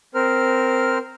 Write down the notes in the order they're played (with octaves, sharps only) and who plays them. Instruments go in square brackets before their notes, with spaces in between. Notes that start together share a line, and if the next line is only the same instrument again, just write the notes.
[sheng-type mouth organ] C4 A#4 C5 F6